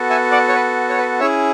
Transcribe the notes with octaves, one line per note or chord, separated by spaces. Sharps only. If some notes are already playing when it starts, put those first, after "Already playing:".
Already playing: B3 F#4 A4
E5 G#5
D5 F#5
C#5
B4
C#5
B4
C#4 E4 G#4 C#5 E5